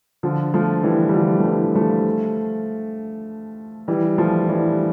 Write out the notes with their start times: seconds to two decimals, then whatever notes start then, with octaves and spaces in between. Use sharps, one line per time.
0.23 D3 F3
0.54 F3 A3
0.83 E3 G3
1.09 G3
1.14 D3 F3
1.39 A3
1.44 E3 G3
1.75 F3 A3
3.88 E3 G3
4.18 F3 A3
4.48 E3 G3